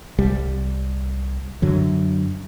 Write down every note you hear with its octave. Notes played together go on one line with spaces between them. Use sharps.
C2 G3
F#2 D3 F#3